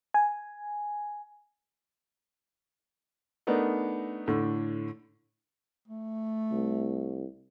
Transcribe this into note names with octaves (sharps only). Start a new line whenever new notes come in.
G#5
A3 B3 D4 D#4 A#4
A2 D3
A3
C2